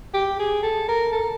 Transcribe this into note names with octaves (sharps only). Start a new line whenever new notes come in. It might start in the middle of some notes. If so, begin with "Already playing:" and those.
G4
G#4
A4
A#4
A4